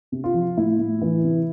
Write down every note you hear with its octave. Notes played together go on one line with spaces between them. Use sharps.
C3
F4
F3
A2 E4
A2
E3
C3